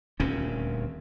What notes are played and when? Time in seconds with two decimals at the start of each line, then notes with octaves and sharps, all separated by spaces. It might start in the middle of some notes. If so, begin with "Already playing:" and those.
0.20 D#1 D2 C4 C#4